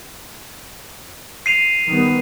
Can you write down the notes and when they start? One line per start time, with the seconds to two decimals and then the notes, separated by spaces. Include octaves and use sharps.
1.46 C7 D#7 F7
1.87 D#3 G3 B3